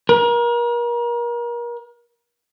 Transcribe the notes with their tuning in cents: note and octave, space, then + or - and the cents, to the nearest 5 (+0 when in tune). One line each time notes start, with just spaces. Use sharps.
A#4 +35